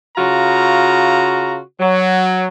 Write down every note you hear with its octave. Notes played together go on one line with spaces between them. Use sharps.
C#3 F4 F#4 A#5
F#3